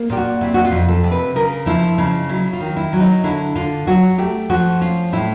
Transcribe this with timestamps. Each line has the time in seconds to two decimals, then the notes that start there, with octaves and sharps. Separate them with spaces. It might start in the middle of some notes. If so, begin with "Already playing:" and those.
Already playing: A#3
0.10 A#2 G4
0.17 F#4
0.41 C3 E4
0.54 F#4
0.65 F4
0.72 F2
0.88 A4
1.03 C3
1.12 B4
1.35 C#3 A#4
1.66 F3 E4
1.98 C#3 D#4
2.29 F#3 E4
2.53 F4
2.61 D#3
2.77 E4
2.93 F#3
3.00 D#4
3.24 D3 E4
3.55 D3 F4
3.87 F#3 F#4
4.18 A3 G4
4.50 F3 F#4
4.81 C#4 F4
5.13 A2 E4